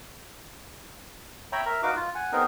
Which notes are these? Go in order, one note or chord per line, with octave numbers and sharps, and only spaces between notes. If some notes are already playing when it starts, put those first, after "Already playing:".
C#5 E5 G5 A#5 B5
A#4 E5 A#5
D#4 F#4 B4 F5 D6
F4
F#5 G#5
B3 C4 D#4 G#4 A#4